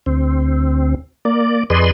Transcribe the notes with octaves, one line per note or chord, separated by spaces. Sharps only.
D2 C4
A#3 D5
F2 G#4 B4 D5 D#5 C6